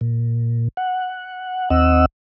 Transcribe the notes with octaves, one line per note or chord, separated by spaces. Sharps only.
A#2
F#5
D#2 C4 D#5 F#5 E6